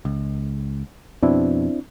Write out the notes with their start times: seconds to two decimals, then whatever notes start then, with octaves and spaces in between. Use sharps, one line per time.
0.05 C#2
1.23 F2 B2 C4 D4 E4